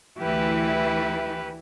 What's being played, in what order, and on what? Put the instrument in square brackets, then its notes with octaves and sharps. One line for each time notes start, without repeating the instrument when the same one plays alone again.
[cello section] D2 E3 E4 [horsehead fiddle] G4 B4